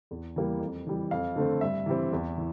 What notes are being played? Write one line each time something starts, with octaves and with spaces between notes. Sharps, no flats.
E2
E3 G3 A#3
F2
E3 G3
F2 F5
D3 A3 C4
G2 E5
E3 G3 C4
E2
E3